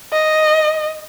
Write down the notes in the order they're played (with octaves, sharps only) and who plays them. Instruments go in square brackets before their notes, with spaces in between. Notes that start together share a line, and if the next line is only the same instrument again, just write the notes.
[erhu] D#5